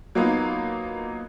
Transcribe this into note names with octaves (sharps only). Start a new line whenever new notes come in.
F#3 A#3 B3 D#4 F4